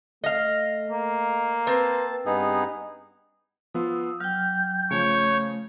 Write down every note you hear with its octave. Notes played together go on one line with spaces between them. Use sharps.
A3 D#5 F5
A#3
C4 B4 A5
G2 B3 D#4 G#4
F3 B3 F4 D#6 E6
F#3 G5 F6 G6
C#3 F3 A3 C#5